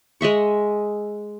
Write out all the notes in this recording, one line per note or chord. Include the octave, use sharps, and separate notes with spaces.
G#3 D#5 E5 C#6